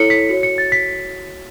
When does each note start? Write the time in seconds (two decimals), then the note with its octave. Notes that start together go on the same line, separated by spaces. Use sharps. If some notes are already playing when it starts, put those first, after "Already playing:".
Already playing: E4 A4 C#5 C#7
0.10 B6
0.29 F#4 C#5 C#7
0.43 C#7
0.58 A6
0.72 B6